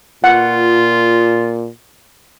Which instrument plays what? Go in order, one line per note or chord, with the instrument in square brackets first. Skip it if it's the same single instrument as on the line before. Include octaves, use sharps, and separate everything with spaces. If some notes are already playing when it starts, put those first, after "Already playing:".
[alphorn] A#2 [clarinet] F4 [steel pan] F#5